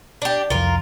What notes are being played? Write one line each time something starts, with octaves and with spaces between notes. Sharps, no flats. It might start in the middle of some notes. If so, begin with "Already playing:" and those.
D4 G4
C2 F2 F4 A#4